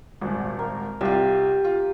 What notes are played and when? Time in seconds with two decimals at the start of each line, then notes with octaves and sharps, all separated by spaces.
0.21 D#1 G#1
0.59 A#4
1.01 C2 F4 G4
1.64 F4